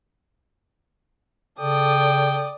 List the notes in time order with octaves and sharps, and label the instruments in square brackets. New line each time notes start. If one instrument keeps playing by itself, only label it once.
[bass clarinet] C#3 [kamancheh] A4 D#6 [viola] D5 [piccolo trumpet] G5